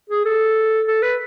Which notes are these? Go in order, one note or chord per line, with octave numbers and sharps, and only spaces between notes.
G#4
A4
A4
B4